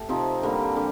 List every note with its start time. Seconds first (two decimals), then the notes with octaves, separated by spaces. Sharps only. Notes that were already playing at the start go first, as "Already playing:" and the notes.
Already playing: A3 G4
0.09 C3 F3 C4 D#4
0.43 D3 G3 A#3
0.76 D3 G3